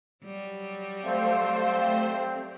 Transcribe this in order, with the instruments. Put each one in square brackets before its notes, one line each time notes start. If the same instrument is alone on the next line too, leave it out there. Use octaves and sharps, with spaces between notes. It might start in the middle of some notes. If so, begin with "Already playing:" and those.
[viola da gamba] F#3 G3
[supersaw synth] A3 C5 [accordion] C4 [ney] F5